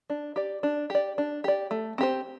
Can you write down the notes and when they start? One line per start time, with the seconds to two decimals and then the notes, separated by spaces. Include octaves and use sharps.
0.10 D4
0.36 G4 D5
0.63 D4
0.90 G4 D5
1.18 D4
1.44 G4 D5
1.71 A3
1.98 C4 G4 C5